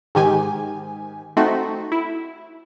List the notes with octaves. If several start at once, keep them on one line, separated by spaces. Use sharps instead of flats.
G#2 D#3 G4 G#5
A3 C4 D#4 F#4
E4